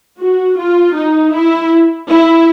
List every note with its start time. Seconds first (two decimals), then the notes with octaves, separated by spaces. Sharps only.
0.20 F#4
0.58 F4
0.95 D#4
1.33 E4
2.09 E4